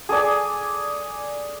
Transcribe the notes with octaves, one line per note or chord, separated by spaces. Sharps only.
G#4 A4 D5 G#5